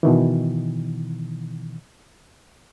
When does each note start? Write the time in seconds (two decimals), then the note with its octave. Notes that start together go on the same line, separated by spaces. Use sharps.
0.03 B2 D#3 E3